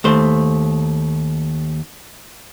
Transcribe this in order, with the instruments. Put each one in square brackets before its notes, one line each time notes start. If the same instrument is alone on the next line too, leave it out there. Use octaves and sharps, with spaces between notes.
[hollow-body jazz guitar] D#2 A3 C5